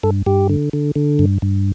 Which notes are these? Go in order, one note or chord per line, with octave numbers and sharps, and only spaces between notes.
G2 A4
G2 G4
D3
D3
D3
G2
G2